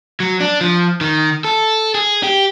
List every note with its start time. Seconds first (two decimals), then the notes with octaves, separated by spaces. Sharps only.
0.20 F#3
0.40 D4
0.61 F3
1.01 D#3
1.45 A4
1.95 G#4
2.23 G4